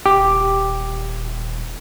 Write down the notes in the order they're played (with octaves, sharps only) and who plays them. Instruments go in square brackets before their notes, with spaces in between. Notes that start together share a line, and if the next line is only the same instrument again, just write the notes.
[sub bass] D#1 [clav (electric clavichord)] G4